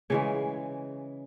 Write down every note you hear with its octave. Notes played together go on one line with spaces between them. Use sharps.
C#3 E3 G#3 C#5